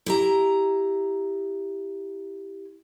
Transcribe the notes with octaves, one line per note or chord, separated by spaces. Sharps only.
E4 G4 A#5